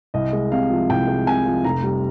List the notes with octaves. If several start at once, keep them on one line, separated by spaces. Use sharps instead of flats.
C2 D#5
G#3
C3 F5
F3
C2 G5
G#3
C3 G#5
F3
F1 A#5
G3